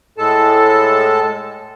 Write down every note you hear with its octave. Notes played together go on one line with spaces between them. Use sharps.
A2 G#3 A4 A5